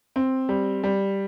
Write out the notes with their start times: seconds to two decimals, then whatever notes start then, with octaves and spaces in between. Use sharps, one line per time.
0.16 C4
0.49 G3
0.84 G3